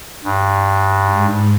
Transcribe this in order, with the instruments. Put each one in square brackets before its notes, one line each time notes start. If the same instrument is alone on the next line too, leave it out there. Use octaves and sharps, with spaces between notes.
[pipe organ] G2
[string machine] G#2